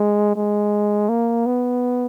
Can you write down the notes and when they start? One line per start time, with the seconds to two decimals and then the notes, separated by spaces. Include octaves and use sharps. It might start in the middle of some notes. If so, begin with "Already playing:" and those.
Already playing: G#3
0.36 G#3
1.09 A#3
1.46 B3